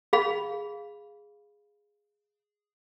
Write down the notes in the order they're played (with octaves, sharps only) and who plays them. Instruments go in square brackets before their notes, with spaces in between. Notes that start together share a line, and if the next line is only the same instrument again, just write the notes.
[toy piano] G#4 F5 B5